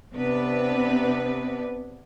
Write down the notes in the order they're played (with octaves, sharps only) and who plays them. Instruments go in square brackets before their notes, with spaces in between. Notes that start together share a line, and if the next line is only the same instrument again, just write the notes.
[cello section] C3 B3 D4 B4